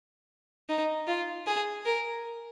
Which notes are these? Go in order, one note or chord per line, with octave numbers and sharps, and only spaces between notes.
D#4
F4
G#4
A#4